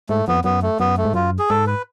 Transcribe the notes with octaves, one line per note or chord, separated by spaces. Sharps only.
G#2 A3
F2 B3
F#2 B3
A3
F#2 B3
A3
G#2
F#2 F4
G#4
G#2 A4
B4